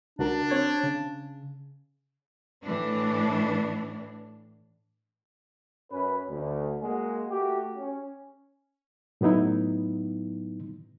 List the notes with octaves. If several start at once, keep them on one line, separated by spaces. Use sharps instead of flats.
C#2 D4 F#4 A#4
C4 C#5 G#6
C#3
A2 E3 D4
F#2 C#4 B4
D2
G#3 A#3 F#4 G#4
A3 F#4 G4
C#4
A2 F#3 B3 D#4 E4